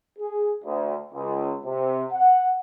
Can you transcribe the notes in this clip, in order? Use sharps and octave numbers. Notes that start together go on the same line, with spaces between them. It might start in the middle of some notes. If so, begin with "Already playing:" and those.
G#4
D2
C#2
C3
F#5